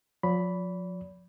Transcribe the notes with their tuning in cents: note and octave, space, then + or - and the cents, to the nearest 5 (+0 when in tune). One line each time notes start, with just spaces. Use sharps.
F3 +40 D5 -45 B5 +0